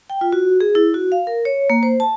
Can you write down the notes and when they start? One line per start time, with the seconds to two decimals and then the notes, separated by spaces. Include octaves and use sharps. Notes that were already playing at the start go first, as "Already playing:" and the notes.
0.10 G5
0.21 F4
0.33 F#4
0.61 G#4
0.75 E4
0.94 F#4
1.12 F5
1.27 A#4
1.45 C#5
1.70 A#3
1.83 C5
2.00 A5